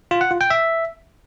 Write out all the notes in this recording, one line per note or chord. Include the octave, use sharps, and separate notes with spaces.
F4
F#5
F4
G5
E5